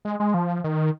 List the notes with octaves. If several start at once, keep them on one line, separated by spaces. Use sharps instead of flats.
G#3
G#3
F3
D#3